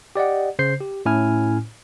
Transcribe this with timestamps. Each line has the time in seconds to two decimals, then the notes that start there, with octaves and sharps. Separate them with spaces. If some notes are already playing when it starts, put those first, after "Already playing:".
0.16 G4 D5 D#5 F#5
0.59 C#3 C5 G6 C7
0.81 G4
1.06 A2 C#4 E4 G#5 F6